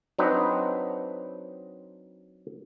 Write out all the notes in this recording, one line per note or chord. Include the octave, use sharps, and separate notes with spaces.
F#3 C4 D4 D#4 B4